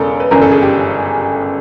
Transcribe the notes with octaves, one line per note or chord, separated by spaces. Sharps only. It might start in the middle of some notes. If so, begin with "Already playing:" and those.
Already playing: E1 E2 C#3 A4 A#4
B4
G1 F#2 C#3 E3 A#4
A4
G#4
G4